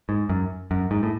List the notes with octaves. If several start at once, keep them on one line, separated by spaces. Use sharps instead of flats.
G#2
F#2
F#2
G#2
A2